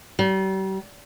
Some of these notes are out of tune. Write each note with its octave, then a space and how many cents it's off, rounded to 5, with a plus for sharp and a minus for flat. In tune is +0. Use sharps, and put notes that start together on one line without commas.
G3 -40